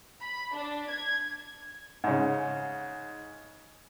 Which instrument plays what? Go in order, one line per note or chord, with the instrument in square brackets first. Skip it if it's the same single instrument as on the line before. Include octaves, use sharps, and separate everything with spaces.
[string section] B5
D4
G#6
[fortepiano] G#2 C#3